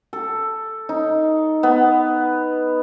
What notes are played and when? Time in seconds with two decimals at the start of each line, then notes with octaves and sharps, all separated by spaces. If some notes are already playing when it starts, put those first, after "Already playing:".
0.13 A4
0.89 D#4
1.63 B3